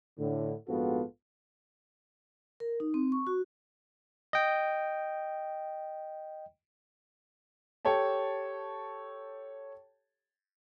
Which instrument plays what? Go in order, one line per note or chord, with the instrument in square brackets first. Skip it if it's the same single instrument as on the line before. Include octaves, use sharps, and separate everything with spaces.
[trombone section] A2 D3
A#1 G#2 B3 F4 F#4 A4
[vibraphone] A#4
D#4
C4
C#6
F#4
[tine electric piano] D#5 G5
[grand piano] G4 A4 C#5 G5 A5